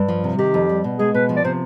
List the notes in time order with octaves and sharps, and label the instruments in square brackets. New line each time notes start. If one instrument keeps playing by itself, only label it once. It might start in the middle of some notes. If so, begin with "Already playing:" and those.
Already playing: [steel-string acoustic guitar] G2
F3
C3
[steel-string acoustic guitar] D#3 [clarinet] G4
[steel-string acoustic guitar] F2
G3
B2
[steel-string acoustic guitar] G#3 [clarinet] G#4
[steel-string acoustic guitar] B2 [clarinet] B4
[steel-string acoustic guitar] F3
[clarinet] D5
[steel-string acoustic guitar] C3 [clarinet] C5